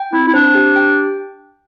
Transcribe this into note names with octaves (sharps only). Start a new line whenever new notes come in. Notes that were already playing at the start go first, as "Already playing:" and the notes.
Already playing: G5
C4 E4
E4
D4 C5
G4
G5